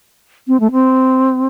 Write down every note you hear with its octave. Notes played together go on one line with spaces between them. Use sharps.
C4
A3
C4